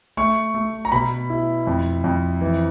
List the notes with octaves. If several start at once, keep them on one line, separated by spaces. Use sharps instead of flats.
A3 C#6
A3
A#5
B2 B5
E4
F2
F2
E3